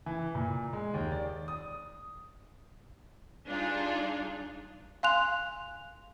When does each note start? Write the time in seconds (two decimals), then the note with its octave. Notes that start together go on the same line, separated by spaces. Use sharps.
0.06 E3
0.35 A#2
0.73 G#3
0.94 D#2
1.12 D5
1.48 D#6
3.48 G3 D4 D#4 F4 G#4
5.03 F5 G#5 C6 F#6 F7